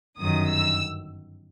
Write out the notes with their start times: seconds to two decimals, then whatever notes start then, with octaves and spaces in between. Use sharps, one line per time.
0.18 G1 F#2 D#3 D#6
0.50 E6